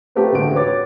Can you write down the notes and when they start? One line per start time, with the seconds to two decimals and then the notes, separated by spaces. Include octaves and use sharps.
0.15 A3 A#3 G4 A4 B4 C5
0.32 A1 D2 G#3 F#4 D7
0.55 B4 C#5 D6 A6
0.68 F#4